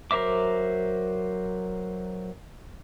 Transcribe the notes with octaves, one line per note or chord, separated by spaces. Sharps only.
F#3 A#4 C5 E5 D6